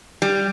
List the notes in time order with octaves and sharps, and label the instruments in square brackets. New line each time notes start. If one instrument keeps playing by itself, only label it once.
[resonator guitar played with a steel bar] G3